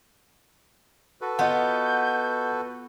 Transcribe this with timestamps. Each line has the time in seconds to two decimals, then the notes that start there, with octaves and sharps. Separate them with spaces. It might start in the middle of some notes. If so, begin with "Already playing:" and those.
1.21 F#4 A4 B4
1.39 B3 F4 D#5 F#5 G6